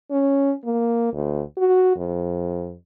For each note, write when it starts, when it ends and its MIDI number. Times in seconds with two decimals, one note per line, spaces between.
0.11 0.52 61
0.65 1.11 58
1.13 1.41 38
1.58 1.94 66
1.96 2.75 41